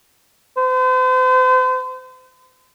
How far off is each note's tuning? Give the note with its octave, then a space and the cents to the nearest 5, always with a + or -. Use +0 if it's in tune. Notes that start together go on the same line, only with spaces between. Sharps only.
C5 -40